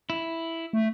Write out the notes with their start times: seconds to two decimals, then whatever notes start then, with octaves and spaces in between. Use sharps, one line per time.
0.10 E4
0.73 A3